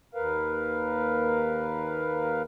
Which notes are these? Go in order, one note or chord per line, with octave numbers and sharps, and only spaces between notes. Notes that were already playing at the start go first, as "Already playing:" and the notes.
D#2 A#4 B4 F5